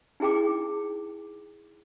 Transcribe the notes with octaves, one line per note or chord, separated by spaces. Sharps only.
D#4 E4 G#4 G5 D6